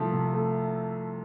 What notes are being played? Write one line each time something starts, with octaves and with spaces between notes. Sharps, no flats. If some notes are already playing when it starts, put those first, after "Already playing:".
Already playing: C2 F3 A3
C3
A3